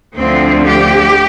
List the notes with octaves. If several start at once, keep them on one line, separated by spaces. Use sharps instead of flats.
D2 D3 F3 C4
G4